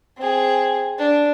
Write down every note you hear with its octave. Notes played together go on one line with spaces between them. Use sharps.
C4 G#4
D4